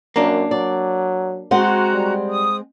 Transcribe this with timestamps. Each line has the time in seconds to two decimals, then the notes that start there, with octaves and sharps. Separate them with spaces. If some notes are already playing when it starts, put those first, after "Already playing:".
0.16 F#2 A#3 D4
0.51 F#3 D5
1.51 G#3 C4 F#4 F#5 A#5
1.93 G3
2.29 D#6